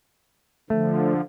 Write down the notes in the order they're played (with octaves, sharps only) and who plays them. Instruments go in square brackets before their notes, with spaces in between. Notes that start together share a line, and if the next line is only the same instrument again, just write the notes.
[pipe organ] D3 F3 [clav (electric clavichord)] A3